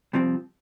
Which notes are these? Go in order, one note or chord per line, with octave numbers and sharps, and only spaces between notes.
C2 C3 F3 C4